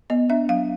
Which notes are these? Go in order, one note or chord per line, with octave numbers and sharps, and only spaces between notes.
B3 D#5
D4 E5
F#3 F5